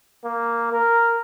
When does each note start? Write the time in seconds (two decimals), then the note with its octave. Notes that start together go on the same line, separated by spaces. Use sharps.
0.24 A#3
0.72 A#4